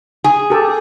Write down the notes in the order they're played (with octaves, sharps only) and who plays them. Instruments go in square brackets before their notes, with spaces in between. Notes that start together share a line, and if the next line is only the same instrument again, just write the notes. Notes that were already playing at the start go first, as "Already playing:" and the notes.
[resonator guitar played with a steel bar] G#4
[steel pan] G4 A4